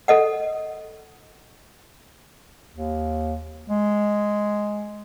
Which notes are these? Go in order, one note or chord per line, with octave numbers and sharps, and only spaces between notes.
A4 D#5 F#5
D#2
G#3